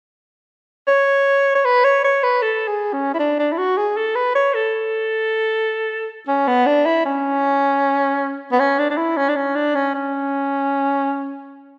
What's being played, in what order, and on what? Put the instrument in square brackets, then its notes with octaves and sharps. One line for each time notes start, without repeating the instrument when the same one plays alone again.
[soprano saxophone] C#5
C#5
B4
C#5
C#5
B4
A4
G#4
C#4
E4
D4
D4
E4
F#4
G#4
A4
B4
C#5
A4
C#4
B3
D4
E4
C#4
B3
C#4
D4
D4
E4
C#4
D4
C#4
D4
C#4
C#4